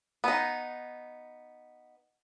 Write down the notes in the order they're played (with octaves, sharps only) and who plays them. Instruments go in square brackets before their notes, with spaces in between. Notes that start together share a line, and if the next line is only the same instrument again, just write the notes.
[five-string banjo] B3 D#4